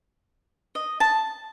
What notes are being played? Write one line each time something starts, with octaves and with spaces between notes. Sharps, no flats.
D#5
A5